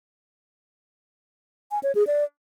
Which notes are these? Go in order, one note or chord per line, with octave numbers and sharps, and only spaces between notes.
G#5
C#5
G#4
D5